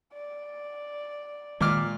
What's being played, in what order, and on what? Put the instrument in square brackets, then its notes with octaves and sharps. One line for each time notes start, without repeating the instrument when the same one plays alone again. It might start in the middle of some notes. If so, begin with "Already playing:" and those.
[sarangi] D5
[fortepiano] A#2 D6 F6 [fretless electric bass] D#3 G#3